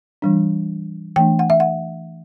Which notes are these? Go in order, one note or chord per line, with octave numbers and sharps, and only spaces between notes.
E3 G3 D4
E3 A3 D4 G5
F#5
E5
F#5